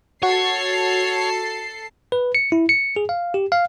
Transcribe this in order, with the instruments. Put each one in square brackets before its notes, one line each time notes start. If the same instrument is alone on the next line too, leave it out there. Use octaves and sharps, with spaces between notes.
[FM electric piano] F#4 [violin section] A4 A5 C7 [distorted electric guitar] C#5
[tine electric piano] B4
C#7
E4
C#7
G#4
F5
G4
F5